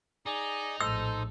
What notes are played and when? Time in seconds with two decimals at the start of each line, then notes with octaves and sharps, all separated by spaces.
0.26 D#4 G#4 D5 A#5
0.81 A#1 A2 A4 C5 E6